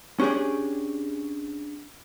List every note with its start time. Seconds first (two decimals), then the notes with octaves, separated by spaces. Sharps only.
0.20 C#4 D4 G4 G#4 D5